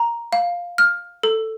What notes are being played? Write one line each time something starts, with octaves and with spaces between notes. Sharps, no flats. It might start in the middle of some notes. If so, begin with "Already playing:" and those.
Already playing: A#5
F5
F6
A4